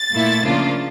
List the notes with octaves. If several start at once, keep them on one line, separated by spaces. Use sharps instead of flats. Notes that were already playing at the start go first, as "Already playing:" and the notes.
Already playing: A6
A#2 A3 E4
C#3 F3 A#3 D4 F4